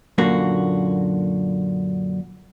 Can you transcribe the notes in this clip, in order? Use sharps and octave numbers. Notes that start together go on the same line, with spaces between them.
F#2 A#2 D3 A#3 F#4